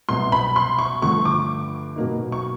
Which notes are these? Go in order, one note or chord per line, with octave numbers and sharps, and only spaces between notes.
C2 B2 F#3 C6
B5
C6
C#6
G2 D3 F3 A3 C#6
D6
B2 F#3 A#3 D#4
C#6